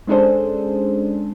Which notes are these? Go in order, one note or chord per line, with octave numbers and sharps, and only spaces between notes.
G#3 C#4 D4 G#4 A4 C5